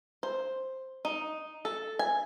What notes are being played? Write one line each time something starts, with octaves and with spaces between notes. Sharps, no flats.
C5
D#4
A4
G#5